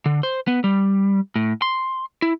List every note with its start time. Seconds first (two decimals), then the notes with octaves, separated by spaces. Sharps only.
0.06 D3
0.23 C5
0.47 B3
0.64 G3
1.36 A2
1.62 C6
2.22 E4